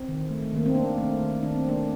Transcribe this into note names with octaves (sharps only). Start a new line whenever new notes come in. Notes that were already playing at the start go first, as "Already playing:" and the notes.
Already playing: C4
D#3
A3
D#3 A#3
C4
D#3 A#3 D4
A3
D#3
D#3 D4
C4
A3 A#3 D4